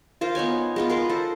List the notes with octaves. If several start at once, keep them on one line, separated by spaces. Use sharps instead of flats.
F4 A#4 C5
B3 D#4 C#5 G#5
G#3 B3 F4
A#4 B4 C6
A4 C5